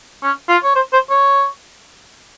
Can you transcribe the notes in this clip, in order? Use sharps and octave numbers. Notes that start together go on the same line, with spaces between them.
C#4
F4
C#5
C5
C5
C#5